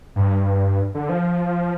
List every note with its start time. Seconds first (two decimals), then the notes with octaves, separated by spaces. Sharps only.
0.16 G2
0.95 D3
1.09 F3